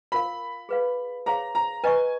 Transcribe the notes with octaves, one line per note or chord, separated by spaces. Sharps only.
F4 A#4 F5 B5
G#4 B4 F5
G#4 C#5 F5 A#5
A#5
B4 D#5 G#5 A#5 C#6